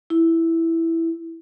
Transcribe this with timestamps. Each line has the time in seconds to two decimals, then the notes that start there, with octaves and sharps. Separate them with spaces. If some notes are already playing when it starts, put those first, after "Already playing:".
0.10 E4